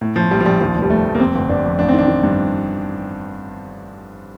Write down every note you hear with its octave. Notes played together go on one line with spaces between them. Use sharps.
A2
A2 F3
A#1 G3
F3
A#1 G3
D#2 F3
F1
G3
F1 A3
F1
A#3
F2 C4
G1
G1 D4
F2
A1 D4
C4
D#3 D4
D#3
G2